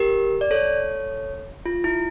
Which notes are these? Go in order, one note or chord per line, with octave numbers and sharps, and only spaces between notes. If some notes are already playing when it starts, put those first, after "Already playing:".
Already playing: G4 A#4
D5
A4 C#5
F4
E4